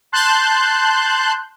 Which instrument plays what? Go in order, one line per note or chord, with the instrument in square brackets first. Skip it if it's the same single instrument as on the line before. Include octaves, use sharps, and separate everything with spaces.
[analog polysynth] A5 C6 F#6 G6